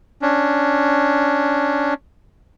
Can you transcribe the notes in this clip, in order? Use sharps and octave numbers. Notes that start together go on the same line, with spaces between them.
C#4 D4